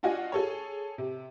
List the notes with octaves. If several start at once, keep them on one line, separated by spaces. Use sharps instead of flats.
D4 F4 F#4 D#5 G#5
G#4 A4 C#5
C3